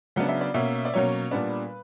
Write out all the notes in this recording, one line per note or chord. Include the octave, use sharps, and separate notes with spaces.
C#3 F#3 B3 D4 F#5
E5
D5
B2 A#3 C#4 E5
D5
B2 F#3 A#3 C#4 C#5
A#2 G3 B3 D4 B4